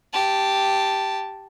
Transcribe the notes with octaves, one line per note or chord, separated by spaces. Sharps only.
G4 A5